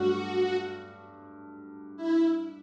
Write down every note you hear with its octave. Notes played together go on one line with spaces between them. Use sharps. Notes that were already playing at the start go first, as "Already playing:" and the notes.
Already playing: G2 F#3 A3 F#4
E4